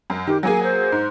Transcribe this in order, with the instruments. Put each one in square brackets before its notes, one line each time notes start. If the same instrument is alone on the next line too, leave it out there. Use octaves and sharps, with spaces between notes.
[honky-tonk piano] F#2
[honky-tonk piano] D#3 [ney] G4
[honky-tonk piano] F#3 A#3 G#4 [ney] G#5
[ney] C5
[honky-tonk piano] G#2